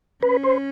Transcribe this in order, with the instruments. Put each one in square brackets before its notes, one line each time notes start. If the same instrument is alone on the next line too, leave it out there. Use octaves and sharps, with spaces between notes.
[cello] C#4 [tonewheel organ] B4
[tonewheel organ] C5